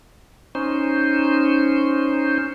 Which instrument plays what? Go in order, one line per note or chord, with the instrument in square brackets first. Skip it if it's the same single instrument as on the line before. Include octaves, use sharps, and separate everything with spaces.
[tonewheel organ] C#4 D#4 C5